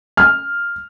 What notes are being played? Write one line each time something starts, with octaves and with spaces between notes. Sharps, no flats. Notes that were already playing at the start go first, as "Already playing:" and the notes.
F6